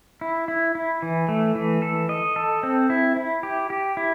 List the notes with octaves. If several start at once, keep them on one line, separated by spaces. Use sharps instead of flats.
E4
E4
E4
E3
A3
E3
A4
D#5
A4
C4
E4
E4
G4
G4
E4